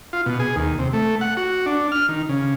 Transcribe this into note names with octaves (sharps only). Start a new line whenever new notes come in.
F4
B2
G#4
D#2
C3
A3
F#5
F#4
D4
F6
D#3
C#3